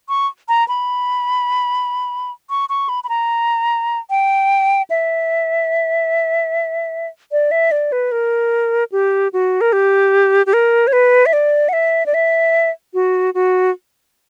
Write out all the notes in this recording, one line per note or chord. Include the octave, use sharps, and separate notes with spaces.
C#6
A#5
B5
C#6
C#6
B5
B5
A#5
G5
E5
D5
E5
D5
B4
A#4
G4
F#4
A#4
G4
G4
A#4
C#5
B4
E5
D5
F#5
E5
D5
E5
F#4
F#4